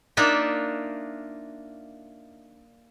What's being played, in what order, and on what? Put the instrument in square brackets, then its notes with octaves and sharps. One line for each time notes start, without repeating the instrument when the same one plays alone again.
[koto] A#3 D4 D#4 F4 E5